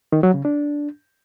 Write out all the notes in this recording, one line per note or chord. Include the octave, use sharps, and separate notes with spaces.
D#3
F#3
C#3
D4